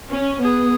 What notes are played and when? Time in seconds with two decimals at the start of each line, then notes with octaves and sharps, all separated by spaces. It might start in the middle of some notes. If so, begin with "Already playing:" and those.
0.12 C#4
0.42 B3 G#4